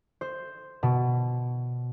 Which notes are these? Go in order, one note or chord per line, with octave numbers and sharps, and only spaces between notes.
C5
B2